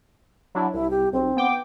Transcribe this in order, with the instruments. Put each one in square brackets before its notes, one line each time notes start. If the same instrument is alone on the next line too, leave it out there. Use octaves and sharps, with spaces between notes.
[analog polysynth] F#3 D4 E4
[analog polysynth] C2 [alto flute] E4
[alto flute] G4
[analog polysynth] B1 [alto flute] C4
[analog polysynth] B3 G5 D6